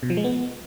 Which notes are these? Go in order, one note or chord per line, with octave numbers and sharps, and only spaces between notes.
B2
F3
G#3
B3